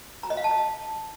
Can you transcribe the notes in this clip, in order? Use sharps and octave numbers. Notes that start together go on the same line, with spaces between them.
A#5
D#5
F5
A5
D#5